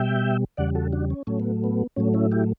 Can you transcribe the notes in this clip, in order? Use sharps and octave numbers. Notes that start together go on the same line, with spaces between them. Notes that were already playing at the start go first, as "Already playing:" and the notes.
Already playing: B2 G3 E5 G5
E2 C#3 G3 D5 F#5
F#4 A4
D4 F#4
C#4
A2 F#3 A3 C#4
B3
B3
A2 F#3 A3 C#4
C#4 E4
E4 G4